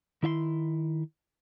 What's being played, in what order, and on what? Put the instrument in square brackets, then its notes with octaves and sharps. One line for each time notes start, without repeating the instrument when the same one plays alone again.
[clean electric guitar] D#3 E4 E5 C6